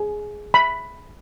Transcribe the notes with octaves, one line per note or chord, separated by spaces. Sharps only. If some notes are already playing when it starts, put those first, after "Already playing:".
Already playing: G#4
B5